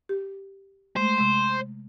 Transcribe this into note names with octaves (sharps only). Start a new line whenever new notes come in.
G4
G#3 A3 C5
C3 G#3